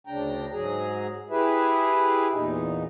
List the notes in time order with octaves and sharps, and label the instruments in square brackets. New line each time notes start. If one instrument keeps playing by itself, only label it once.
[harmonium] D2 C#3 D4 G5 A#5
G#2 F#3 G#4 A#5
E4 G4 G#4 B4 E5
E2 A#2 D#4